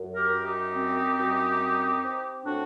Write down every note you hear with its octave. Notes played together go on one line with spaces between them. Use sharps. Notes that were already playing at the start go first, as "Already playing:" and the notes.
Already playing: F#2
G4 A#4
F#2
D#4 G4
C4
F#2
C4
C4
A2 D4 F#4